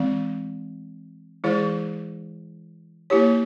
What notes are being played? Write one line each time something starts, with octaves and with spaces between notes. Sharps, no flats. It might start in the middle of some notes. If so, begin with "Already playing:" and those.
Already playing: E3 G#3 C4
E3 G#3 E4 G#4 C5
A#3 E4 G4 C#5